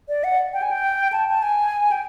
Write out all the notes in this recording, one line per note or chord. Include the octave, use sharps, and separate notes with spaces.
D5
F#5
G5
G#5
G5
A5
A5
G#5
G5